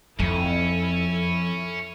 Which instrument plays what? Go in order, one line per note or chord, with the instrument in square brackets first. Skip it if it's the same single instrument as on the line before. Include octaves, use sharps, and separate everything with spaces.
[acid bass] F2 [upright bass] F3 [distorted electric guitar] C#4 [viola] E4 A4